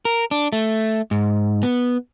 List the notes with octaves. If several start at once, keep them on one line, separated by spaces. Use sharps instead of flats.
A#4
D4
A3
G#2
B3